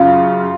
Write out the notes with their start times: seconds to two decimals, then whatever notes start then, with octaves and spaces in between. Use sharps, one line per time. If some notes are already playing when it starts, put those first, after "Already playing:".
Already playing: F#2 C#3 F4